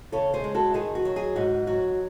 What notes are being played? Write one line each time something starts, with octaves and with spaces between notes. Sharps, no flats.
C#3 A4 C#5
G#4 C5
G#3
F#4 A4
D#3 G#4
F#4
F#3
G#4
G#2 F#4
F#3 F#4